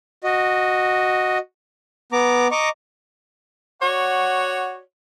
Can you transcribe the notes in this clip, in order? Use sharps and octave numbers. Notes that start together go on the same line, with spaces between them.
F#4 D#5
B3 A#5 D6
D#5 A#5 C#6 D6
F#4 C#5 D5 F#5